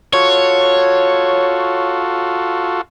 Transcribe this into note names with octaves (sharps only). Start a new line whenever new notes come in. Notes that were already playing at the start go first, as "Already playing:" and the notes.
F4 F#4 A4 C#5